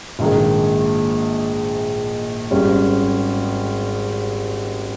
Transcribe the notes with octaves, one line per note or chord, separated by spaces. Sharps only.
A#1 G#2 D#3 G#3
G#1 G#2 G3 C#4